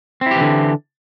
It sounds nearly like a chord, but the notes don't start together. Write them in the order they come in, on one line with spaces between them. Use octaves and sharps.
C4 E4 G4 E3 D3